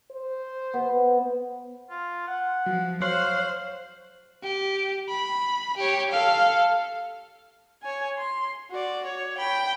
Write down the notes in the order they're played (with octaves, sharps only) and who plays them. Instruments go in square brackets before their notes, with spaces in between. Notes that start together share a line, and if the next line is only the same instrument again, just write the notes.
[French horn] C5
[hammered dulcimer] B3
[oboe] F4
F#5
[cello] F3 [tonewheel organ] F#3
[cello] C5 [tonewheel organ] C#5 C6 F#6 [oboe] F5
[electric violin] G4
B5
G4 C#5
A4 F5
[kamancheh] C#5 G#5
C6
F#4 D5
C#5
G5 B5